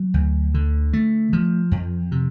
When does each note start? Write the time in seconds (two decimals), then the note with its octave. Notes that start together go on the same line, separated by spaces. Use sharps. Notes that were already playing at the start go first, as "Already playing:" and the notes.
Already playing: F#3
0.14 D2
0.54 D3
0.93 A3
1.33 F3
1.71 F2
2.12 C3